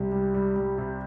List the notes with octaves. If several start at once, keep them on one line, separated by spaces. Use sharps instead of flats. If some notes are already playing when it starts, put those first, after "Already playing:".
Already playing: C2 C3 G3
G3
G3
G3
C3